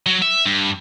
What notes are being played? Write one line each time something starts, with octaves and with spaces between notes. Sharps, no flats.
F#3
E5
G2